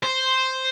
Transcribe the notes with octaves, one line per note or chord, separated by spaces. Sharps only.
C5